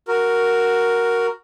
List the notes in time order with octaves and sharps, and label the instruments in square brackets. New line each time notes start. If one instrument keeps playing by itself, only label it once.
[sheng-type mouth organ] F#4 A#4